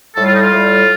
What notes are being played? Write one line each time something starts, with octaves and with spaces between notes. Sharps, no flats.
A2 G3 A4
F4
D#4
F4
A2 G3